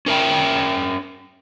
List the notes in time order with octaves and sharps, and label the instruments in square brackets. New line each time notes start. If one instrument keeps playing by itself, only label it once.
[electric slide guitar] C#4 A#4 E5 G5